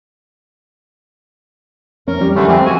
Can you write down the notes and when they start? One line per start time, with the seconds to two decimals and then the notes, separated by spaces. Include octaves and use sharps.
2.08 C#4 A#4
2.21 G3
2.35 D3 E3 A3
2.48 F3 G#3 C4
2.66 F#4 G#5